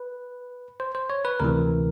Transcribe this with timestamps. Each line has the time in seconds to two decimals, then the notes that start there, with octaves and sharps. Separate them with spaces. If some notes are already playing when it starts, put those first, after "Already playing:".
Already playing: B4
0.80 C5
0.95 C5
1.10 C#5
1.25 B4
1.40 D2 C3 E3 A#4